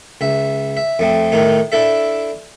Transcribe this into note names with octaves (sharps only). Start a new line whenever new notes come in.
C#2 E5
E5
F2 A3 C4
A2 D#3 A3 D#4
D4 E4 A4 E5